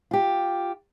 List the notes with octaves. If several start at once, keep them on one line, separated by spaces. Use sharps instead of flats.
F4 G4